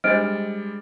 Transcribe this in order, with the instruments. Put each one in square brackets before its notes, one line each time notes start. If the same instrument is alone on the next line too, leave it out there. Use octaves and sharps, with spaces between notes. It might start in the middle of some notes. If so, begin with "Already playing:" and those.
[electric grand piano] G3 G#3 A6 [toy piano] D4 C5 D#5 [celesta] F6 D7